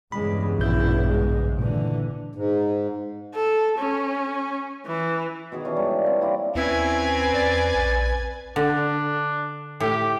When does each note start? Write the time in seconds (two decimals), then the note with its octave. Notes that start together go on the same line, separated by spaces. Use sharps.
0.12 E2 G2 C#3 G#3 B5
0.58 A#1 B2 E4 G6
1.07 G#2 G#3
1.59 A#2 D3 E3
2.35 G#2
3.34 A4
3.78 C#4
4.86 E3
5.52 B2 D#3 G#4 G#5
5.65 E3 C#4 D4 G4
5.76 G#2 G3 A4
5.91 A#3
6.06 C4
6.21 A#3 C#4 E4 D5
6.55 D#2 C4 C#4 E4 B4 G#5
7.34 E2 D5
7.75 A#1
8.56 D3 D4
9.80 A2 G4